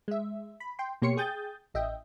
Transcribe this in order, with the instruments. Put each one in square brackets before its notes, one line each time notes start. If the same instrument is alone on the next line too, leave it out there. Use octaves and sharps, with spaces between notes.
[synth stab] G#3 E5
B5
G5 C6
B2 A#3 G4 C#5 C6 C#7
G#4 G5 D#6 G6 A6
A1 D#5 E5 G5